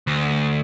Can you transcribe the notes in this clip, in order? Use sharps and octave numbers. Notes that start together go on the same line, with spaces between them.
D2